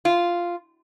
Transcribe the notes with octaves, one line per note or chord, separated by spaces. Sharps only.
F4